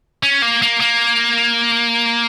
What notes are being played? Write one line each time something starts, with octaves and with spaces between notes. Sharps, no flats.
C#4
A#3
A#3
A#3